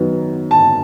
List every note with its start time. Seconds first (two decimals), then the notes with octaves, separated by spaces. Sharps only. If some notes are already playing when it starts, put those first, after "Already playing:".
Already playing: F#2 D#3 F#3 B3
0.51 A5